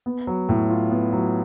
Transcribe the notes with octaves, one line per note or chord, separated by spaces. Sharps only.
B3
F#3
A2
F4
B3
F#3